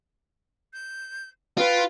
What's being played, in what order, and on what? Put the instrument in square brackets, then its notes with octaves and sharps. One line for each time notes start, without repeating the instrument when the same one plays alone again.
[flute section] G6
[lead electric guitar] F4 [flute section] B4 G5